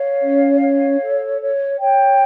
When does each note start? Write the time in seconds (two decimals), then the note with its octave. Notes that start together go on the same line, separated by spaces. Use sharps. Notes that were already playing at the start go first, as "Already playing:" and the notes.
Already playing: C#5 F5
0.21 C#4
0.60 C#5
1.01 A4
1.41 C#5
1.80 C#5 G5